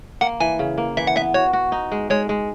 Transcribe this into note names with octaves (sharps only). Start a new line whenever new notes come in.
A#3 F#5
E3 G#5
C#3
A#3
E3 E5
F#5
B3 E5
F#4 C#5
F#4
D#4
G#3
G#3 C#5
G#3